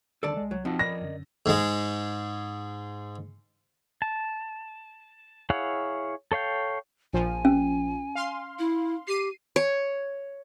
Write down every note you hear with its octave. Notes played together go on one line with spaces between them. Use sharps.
D#2 D3 G3 A4 D5 A5
C2 G#3 D#5
C2 F#3 C#5
F2 C4 D#4 F4 F#4 F#5 A5
A#4 D5 D#5 B5 A#6
F#2 D3 C#4
G#2 G#3
A5
E4 G#4 C#5 F5 F#5
A4 C#5 F5 G5
A#1 F3 G#5
C#4
F5 C6
E4
G4 C7 D#7
C#5